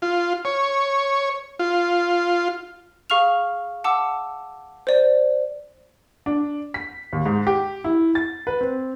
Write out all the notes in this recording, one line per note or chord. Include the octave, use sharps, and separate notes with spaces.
F4
C#5
F4
G#4 F5 C#6 F6 F7
F#5 A5 D6 E6
C5 D5
D4
B6
D#2
G#2
G4
E4
A6
B4
C4